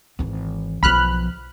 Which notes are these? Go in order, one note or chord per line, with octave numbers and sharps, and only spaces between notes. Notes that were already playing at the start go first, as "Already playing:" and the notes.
G#1 E3
B1 F3 B5 F6 F#6